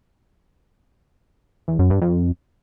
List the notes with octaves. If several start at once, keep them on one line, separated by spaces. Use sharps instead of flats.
E2
F#2
G2
F2